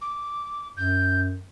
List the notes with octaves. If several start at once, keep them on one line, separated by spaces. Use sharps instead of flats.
D6
F#2 G6